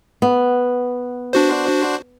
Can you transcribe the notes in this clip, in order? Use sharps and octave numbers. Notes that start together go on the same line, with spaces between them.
B3
D4 F#4 C5